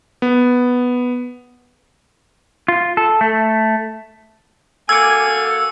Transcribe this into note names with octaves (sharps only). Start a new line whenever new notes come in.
B3
F4
A4
A3
A#3 F#4 A4 G#5 D6 E6 G#6